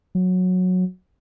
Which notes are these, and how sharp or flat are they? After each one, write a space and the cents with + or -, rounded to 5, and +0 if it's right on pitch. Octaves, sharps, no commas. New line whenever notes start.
F#3 -15